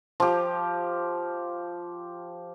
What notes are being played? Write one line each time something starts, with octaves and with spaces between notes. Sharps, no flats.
F3 G4